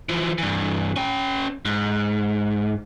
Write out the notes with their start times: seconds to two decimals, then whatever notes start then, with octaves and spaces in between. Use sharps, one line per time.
0.09 E3 F3
0.38 G2 E3
0.96 C#4 G5
1.65 G#2